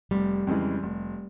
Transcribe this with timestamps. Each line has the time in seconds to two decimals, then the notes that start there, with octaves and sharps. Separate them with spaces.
0.11 F1 G3
0.47 F2 C#3 E3 G#3
0.83 F1